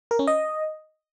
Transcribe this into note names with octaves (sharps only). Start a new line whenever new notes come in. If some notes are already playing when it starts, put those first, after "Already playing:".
A#4
C#4
D#5